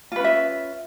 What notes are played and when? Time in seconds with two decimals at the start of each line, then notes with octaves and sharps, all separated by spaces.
0.12 F4
0.16 B4
0.20 C#4
0.24 E5